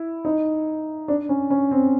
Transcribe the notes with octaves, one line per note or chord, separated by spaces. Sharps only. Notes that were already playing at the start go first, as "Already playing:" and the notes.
Already playing: E4
D#4
D4
C#4
C#4
C4